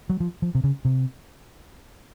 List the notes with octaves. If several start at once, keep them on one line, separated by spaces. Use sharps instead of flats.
F#3
F3
F3
C3
C#3
C3